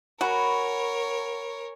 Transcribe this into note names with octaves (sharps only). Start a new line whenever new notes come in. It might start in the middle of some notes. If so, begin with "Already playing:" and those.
F#4 A#4 C#5 G#5 B5